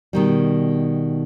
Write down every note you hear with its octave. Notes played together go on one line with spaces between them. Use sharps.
B2 D#3 G3